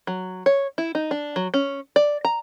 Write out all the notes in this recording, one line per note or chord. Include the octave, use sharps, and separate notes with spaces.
F#3
C#5
E4
D#4
D4
F#3
C#4
D5
A#5